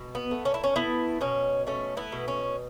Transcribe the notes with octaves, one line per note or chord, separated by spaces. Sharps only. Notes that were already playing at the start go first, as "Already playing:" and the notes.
Already playing: B2
B3
A3
C#4
E4
C#4
A3 B3 E4
B2 C#4
A3 C#4
B3 E4
B2
C#4